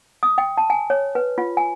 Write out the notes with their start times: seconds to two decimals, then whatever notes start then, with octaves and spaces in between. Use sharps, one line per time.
0.23 D#6
0.38 G5
0.57 A5
0.70 G#5
0.90 C#5
1.15 B4
1.38 F4
1.57 G#5